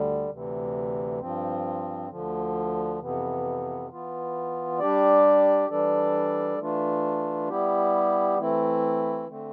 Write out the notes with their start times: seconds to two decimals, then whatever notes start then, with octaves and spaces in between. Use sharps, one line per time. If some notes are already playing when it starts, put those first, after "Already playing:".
Already playing: D2 D3 G3
0.30 D2 C3 E3
1.20 G2 F3 C4
2.10 D2 D3 F3
2.99 F2 C3 E3 B3
3.89 E3 B3 F4
4.79 G3 D4 G4 D5
5.69 E3 G3 D4 A4 D5
6.58 E3 A3 D4 F4
7.48 G3 B3 E4 G4
8.38 E3 A3 C4 E4
9.28 D3 A3 C4